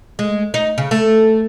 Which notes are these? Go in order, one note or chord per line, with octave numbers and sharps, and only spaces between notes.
G#3
D#4
C#3
A3